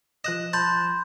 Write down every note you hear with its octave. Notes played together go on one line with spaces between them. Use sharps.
F3 D#5 F#6 E7
A5 B5 C6 G6